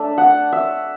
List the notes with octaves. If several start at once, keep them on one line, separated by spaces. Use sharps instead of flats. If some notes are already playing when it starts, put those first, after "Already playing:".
Already playing: A3 D4 E5
F#5
E5